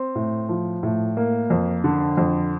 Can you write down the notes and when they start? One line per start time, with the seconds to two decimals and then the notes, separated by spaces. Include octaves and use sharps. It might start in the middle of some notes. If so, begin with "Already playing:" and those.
Already playing: C4
0.15 A2
0.49 F3
0.83 A2
1.17 A#3
1.50 F2
1.84 D3
2.17 F2